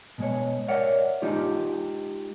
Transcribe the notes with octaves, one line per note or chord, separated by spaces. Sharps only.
B2 G#3 C#5
A#4 C#5 D5 E5 F#5
G#3 D#4 F4 G4